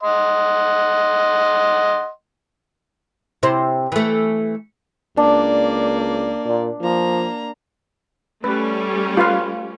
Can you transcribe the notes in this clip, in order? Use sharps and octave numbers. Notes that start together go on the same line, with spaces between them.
D#5 F#5 C6
C3 E4 C5
E3 A3
C#2 A#3 D4 D5
A#2
F3 A#3 A#5
G3 A3 C#4 B4
F4 B4 F5